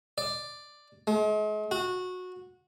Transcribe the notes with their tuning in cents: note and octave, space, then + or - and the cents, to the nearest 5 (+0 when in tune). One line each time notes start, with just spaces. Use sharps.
D5 +5
G#3 +40
F#4 -20